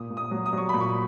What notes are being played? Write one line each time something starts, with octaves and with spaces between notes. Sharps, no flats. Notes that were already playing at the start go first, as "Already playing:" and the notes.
Already playing: A#2 D#6
A#2
D#6
F#3
D#6
F#3 C#6
A#2 B5
C#6